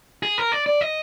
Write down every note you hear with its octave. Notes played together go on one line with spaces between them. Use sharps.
G#4
A#4
D5
D5
D#5